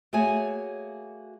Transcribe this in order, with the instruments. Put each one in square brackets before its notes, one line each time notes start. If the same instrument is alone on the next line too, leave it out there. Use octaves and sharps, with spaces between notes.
[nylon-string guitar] A3 A#3 F#4 G#4 C#5 G#5